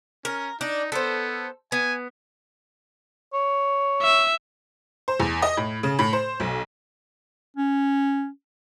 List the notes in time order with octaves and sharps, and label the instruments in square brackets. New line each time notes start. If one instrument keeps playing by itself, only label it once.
[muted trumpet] C#4 [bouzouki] A#4
[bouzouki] D4 [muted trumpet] D#4
[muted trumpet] B3 [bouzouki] A4 C5
[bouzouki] B3 [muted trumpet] G#5
[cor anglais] C#5
[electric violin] E5
[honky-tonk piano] C5
E2
D#5
A2
C#3
A2
C5
B1
[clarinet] C#4